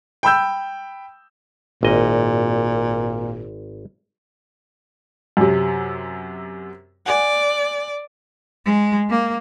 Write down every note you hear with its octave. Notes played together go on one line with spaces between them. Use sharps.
G5 B5 E6 G6
G#1 A#2 D#5
F#2 C3
D5 F#5 G#5
G#3
A#3